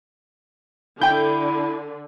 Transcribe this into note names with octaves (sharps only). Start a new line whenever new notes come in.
D3 E4 G5 G6